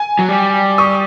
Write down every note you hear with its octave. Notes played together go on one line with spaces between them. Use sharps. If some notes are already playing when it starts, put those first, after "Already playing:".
Already playing: G#5
F#3
G3
C#6 D#6